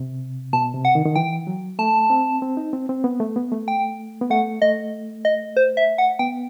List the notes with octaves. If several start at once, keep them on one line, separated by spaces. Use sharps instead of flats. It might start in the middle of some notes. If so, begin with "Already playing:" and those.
Already playing: C3
B2 A5
C3
F#5
D#3
D#3
E3 G5
F#3
A3 A5
C4
C4
D#4
C4
C4
B3
A3
B3
A3
G5
B3
A3 F#5
A3 D#5
D#5
C5
E5
F#5
B3 G5